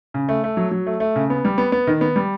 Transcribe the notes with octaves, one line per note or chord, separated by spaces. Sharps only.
C#3
A3
A3
F#3
F#3
A3
A3
C#3
B3
G3
B3
B3
D#3
B3
G3